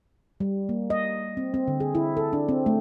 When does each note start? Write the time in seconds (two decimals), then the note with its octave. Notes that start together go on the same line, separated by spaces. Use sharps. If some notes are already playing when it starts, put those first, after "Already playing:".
0.40 G3
0.69 A#3
0.90 D#5
1.37 C4
1.54 C4
1.68 D3
1.80 G#4
1.95 E4
2.17 A4
2.33 D4
2.49 C4
2.66 A3